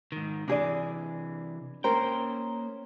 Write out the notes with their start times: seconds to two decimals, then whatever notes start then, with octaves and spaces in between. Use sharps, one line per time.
0.12 G#2 D#3
0.48 C3 E3 D4 G#4 D5
1.84 A#3 C#4 A#4 C5 G5